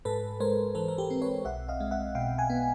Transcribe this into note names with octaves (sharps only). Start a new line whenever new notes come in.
G#2 A4 B4
G#3 A#4 C5
E3 A4 B4
A#4
G4 A4
C4
B4 C#5
B1 E5 F#5
D#5 F5
G#3
E5 F#5
B2 F5 G5
F#5 G#5
B3